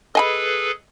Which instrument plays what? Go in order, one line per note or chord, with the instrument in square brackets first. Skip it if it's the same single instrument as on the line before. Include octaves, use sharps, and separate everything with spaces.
[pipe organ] G#4 A4 B4 [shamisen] D#5 G#5 B5